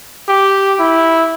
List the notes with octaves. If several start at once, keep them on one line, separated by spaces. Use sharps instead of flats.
G4
E4